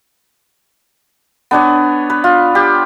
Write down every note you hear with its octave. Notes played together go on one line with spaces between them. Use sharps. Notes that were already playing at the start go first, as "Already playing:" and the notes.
B3 D4 C#5
B4
F4
G4